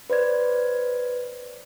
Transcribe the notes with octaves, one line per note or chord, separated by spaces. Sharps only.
B4 C5 D5 G#6